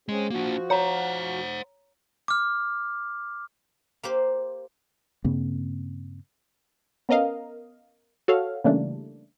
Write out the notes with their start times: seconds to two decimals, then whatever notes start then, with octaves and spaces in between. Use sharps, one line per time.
0.09 G#3 C4 C#4 G#4
0.30 F3 A#3 D4 F#4
0.70 C5 C#5 F#5 A#5
2.28 D6 F6
4.03 A#3 G4 C5
5.24 G2 C#3 A#3 C4
7.09 B3 C#4 A#4 D#5 F5
8.28 F#4 A4 C#5 F5
8.64 C#3 E3 G3 A3 A#3 D4